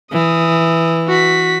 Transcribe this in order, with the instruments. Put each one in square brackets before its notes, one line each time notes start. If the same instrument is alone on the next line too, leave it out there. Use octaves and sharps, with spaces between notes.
[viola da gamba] E3 [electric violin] D#6
[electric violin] F#4 B6